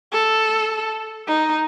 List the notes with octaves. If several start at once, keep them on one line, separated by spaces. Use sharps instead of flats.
A4
D#4